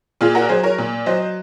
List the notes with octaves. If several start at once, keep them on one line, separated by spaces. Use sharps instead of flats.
A#2 F4 G#4
F#4 A#4
F#3 G#4 C5
A#4 C#5
A#2
F#3 C5 D#5